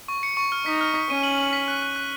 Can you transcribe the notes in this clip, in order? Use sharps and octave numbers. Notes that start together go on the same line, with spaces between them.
C#6
C#7
C#6
F6
D#4 B6
F6
B6
C#4 D#7
F#7
F#7
B6
F#6
F#6
F#6